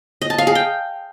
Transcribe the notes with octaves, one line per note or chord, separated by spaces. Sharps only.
D#5
A5
F5
G#4
G5